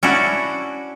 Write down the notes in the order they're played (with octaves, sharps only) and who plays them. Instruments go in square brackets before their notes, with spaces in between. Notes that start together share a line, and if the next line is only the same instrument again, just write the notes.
[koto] C#4 D4 E4 F#4